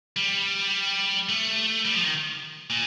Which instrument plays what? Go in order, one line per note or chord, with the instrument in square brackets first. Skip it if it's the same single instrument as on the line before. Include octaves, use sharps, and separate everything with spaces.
[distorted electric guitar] G3
A3
G3
F3
D#3
A#2